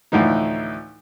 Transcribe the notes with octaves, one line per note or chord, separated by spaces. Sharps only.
D2 A2 E3 F3 D#4